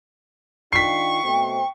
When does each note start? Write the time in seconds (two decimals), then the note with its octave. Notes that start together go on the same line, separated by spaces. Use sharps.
0.73 D#3 D4 F4 G5 C#6 B6 C7
1.23 B2 A3 C4